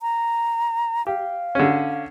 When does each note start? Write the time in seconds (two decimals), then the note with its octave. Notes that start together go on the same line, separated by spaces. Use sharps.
0.02 A#5
1.07 G4 F5
1.55 D3 C#4